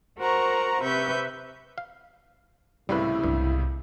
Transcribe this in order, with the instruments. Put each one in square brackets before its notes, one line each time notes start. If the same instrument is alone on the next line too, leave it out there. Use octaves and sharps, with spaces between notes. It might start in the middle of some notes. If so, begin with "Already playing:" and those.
[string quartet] F#4 A#4 C5 F#5 A#5 C#6
C3 B4 E5 C#6 G6
[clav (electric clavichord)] F5
[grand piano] C#2 A2 C3 [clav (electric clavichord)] G3 B4 [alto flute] E4
[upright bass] C2 [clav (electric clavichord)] G2